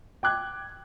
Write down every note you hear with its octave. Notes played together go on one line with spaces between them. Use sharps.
G5 D6 F#6 G#6